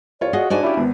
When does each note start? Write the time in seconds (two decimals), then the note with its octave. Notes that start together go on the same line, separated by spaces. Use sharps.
0.21 C2 F4 C#5 D5
0.33 F#4 G#4 D#5
0.50 G#2 D4 F#4 D5 G#5
0.63 C#4 E4 F4 G4
0.77 G#1 B3